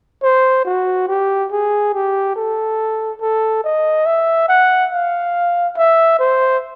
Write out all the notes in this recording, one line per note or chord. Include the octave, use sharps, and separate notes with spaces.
C5
F#4
G4
G#4
G4
A4
A4
D#5
E5
F#5
F5
E5
C5